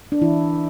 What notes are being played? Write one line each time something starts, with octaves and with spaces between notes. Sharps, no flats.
D4
E3 E4